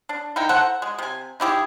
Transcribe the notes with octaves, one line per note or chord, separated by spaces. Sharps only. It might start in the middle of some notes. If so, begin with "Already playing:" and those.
D4
D#4 E4 A#4 G5
A4 C5 F#5
G#3
C3 G#5
D#4 E4 G4 G#4